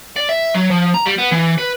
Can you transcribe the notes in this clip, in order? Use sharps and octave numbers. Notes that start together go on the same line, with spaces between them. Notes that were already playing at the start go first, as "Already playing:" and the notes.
D5
E5
F#3
F3
A#5
G3
B3
E3
B4